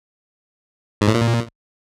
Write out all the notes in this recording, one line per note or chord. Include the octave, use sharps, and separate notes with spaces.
G#2
A2
A#2